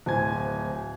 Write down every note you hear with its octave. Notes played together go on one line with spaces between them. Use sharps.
D1 C5 G#5 G#6